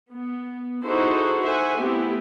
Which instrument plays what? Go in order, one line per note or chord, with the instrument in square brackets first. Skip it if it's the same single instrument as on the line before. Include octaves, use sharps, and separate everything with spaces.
[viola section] B3
D#4 E4 F#4 G#4 A4 C5
C5 E5 F#5 G#5
A3 B3 C4 E4 G4